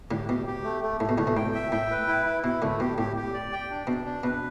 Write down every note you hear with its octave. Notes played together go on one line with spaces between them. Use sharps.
A2 D3 G4
B2 G4
G4
A3
A3
A2 A3
B2
A2 D3 A3
B2
A2 G5
E5
A2 G5
B4
E4
E4
B2 E4
A2 D3 A3
B2 G4
A2 G4
G4
D5
G5
D4
B2 D4
D4
B2 B4